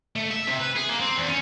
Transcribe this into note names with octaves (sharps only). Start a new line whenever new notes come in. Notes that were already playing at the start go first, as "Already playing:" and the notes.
A3
E5
C3
B4
G#4
A#3
C4
E2
C#4